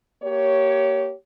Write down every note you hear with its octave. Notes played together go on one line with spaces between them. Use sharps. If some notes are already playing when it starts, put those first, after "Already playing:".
A#3 G4 C#5